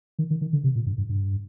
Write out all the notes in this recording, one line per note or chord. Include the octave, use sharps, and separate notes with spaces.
D#3
D#3
D#3
D3
C3
A#2
G2
G2
G2